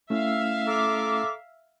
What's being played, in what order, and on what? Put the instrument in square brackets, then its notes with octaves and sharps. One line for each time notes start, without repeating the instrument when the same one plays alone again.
[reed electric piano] A3 C#4 E4 [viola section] E5 F5
[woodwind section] A4 A#5 D6